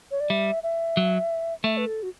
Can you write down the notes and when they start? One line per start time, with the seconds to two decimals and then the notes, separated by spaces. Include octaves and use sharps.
0.11 C#5
0.20 D5
0.30 G3 E5
0.63 E5
0.97 F#3
1.64 A3 E5
1.77 B4
1.87 A4
2.03 F#4